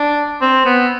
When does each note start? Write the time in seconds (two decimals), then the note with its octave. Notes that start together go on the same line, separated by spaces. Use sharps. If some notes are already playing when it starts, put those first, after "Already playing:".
Already playing: D4
0.41 C4
0.65 B3